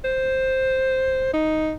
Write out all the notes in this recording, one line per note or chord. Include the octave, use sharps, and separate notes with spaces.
C5
D#4